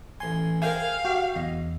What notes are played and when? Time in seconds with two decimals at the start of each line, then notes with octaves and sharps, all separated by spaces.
0.20 A1 G#5 C6
0.62 G#4 A#4 C5 E5 F5 G5 G#5
1.05 F#4 G4
1.36 E2 D#5